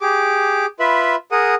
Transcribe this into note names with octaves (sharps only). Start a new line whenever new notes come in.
G4 G#4 D6
F4 B4 E5 B5
G#4 A#4 F#5 D#6